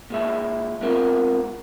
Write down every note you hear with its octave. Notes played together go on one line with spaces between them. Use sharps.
A#2 G#3 E5
G#3 B3 C4 F4 A#4